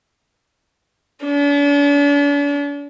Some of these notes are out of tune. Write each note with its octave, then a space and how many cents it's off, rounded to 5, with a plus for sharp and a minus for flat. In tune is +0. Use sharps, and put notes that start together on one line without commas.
D4 -45